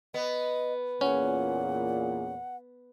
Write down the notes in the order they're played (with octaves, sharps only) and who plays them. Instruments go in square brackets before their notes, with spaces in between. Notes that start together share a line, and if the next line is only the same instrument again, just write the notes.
[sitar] B3 [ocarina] D#5
[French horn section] E2 A#2 G#4 [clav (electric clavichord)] C#4 [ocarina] F#5